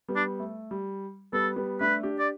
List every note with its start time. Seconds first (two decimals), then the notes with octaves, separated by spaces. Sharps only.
0.08 G3 B3
0.16 D4
0.40 A3
0.71 G3
1.33 G3 B3 A4
1.56 G3 B3
1.81 A3 D4 B4
2.03 D4 G4
2.19 D5